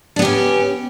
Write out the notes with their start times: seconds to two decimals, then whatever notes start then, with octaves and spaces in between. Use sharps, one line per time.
0.16 D4
0.19 B3
0.22 G4
0.25 C#4